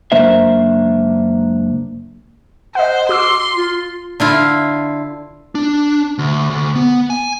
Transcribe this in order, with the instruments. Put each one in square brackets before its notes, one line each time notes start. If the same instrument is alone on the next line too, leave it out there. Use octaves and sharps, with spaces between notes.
[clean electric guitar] C#2 F#2 A#3 D4 C5 E5
[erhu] C5 [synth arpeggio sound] D#5 F#5
[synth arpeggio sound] F#4 D6 E6 [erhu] C6
[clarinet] F4
[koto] D3 E4 F4
[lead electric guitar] D4
D2
D2
B3
G#5